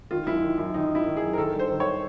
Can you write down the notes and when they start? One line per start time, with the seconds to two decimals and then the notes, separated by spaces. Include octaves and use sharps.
0.11 D#3 F4
0.26 F#2 E4
0.42 D#3
0.58 F#2 E4
0.74 D#3 D#4
0.90 F#2 E4
1.06 D#3
1.17 G#4
1.22 F#2
1.33 A#4
1.38 D#3 A4
1.54 G2
1.59 C5
1.70 D#3
1.80 C#5